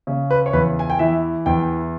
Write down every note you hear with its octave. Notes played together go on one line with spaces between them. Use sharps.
C#3
B4
C#5
E2 B4
G#5
G5
E3 E5
E2 G5